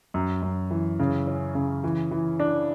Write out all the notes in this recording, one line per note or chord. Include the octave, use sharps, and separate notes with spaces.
F#2
F#2
E3
C#3
C#4
C#3
E3
E3
D4